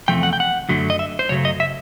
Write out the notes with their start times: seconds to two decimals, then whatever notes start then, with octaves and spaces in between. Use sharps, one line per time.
0.08 E2 C3 F3 A3 G5
0.23 F#5
0.33 G5
0.40 F#5
0.69 F#2 D3 F#3 A3
0.90 D#5
0.99 E5
1.19 C5
1.29 F#2 C#3 F#3 A3 C#5
1.45 D#5
1.60 E5